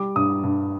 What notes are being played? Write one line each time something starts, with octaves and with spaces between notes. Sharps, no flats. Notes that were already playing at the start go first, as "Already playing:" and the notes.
Already playing: G3 D6
G2 D#6
G2